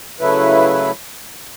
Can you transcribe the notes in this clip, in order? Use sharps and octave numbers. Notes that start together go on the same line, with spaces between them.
C#3 F#3 A3 E4 B4